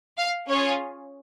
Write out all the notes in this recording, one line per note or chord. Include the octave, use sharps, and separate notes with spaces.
F5
C#4 F4 G#4 C#5